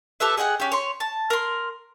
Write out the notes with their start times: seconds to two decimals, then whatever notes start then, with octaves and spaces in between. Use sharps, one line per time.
0.20 G4 A4 B4 E5
0.37 G#4 D#5 F#5 G5
0.60 C#4 G4
0.72 C#5 C6
1.00 A5
1.30 A#4 C6